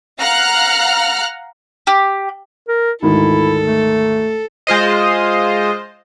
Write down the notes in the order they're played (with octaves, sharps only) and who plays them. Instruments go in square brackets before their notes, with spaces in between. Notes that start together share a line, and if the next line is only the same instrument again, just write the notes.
[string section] F5 F#5 A#5 F6 F#6
[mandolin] G4
[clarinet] A#4
[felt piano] D2 G#2 D#3 [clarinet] E4 [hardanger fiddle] A4
[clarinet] A3
[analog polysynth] G#3 F4 C5 D#5